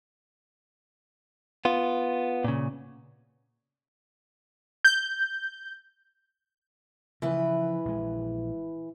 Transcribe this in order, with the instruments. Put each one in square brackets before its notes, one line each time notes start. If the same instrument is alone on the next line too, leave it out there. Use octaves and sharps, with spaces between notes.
[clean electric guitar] B3 F4
A#2 C#3
[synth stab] G6
[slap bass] C#3 F3 [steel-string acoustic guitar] E3 B4
[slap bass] A#1 G#3